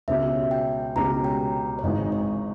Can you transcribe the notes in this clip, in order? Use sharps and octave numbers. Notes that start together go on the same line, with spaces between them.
C#2 B2 G#3 C#4 G4 E5
G5
C#2 B2 G#3 C#4 G4 A#5
G5
C#5
G#1 G#2 E3 G#3 D#4 D#5
C#5